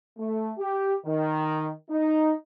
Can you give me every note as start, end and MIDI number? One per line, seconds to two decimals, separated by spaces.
0.18 0.52 57
0.58 0.93 67
1.05 1.71 51
1.89 2.31 63